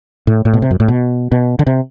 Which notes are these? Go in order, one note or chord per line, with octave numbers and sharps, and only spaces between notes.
A2
A2
B2
C3
F#2
A2
B2
B2
D3
C3